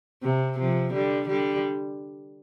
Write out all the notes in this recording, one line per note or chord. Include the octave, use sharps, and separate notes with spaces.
C3
C3 F3
D3 G3
D3 G3